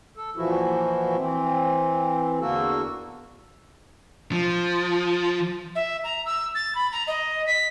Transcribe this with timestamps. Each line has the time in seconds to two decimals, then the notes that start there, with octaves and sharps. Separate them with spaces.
0.17 A4
0.36 A#2 E3 F3 E4 F#4
1.17 E3 C4
2.40 E2 D3 A#3 F#4 A4
4.32 F3
5.75 E5
6.04 A#5
6.26 E6
6.55 A6
6.75 B5
6.92 A#5
7.07 D#5
7.47 B6